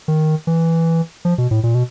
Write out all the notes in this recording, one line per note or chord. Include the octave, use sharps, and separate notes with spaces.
D#3
E3
F3
B2
A2
A#2
B2